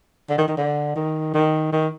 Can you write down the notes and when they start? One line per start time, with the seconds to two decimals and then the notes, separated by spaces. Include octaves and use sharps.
0.30 D3
0.38 D#3
0.48 D#3
0.58 D3
0.96 D#3
1.34 D#3
1.72 D#3